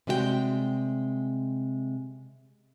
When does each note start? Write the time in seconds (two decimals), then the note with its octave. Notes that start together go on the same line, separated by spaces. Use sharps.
0.07 C3 G3 G#3 F#4 C#5 G5